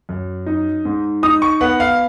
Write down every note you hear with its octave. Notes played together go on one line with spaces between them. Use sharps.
F#2
D#4
G#2
D#4 D#6
C#6
B3 F#5
F5